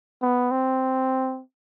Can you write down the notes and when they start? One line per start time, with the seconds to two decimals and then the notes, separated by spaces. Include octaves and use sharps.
0.22 B3
0.51 C4